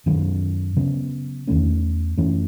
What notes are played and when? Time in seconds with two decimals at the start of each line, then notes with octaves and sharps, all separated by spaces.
0.06 F#2 D#3 F#3
0.76 C#3 F#3 B3
1.47 E2 D#3 A3 C#4
2.17 F#2 E3 A3 C#4